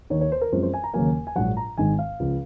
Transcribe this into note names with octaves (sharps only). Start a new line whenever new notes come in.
D#2 D#3 A#3 C#5
C#5
C5
A#4
F#2 F3 G#3 C4 C5
C5
G#5
A#5
D#2 C#3 F#3 A#3 G#5
G#5
A#1 G#2 F#3 F#5
A#5
G#1 G#2 D#3 G#5
F5
C#2 C#3 F3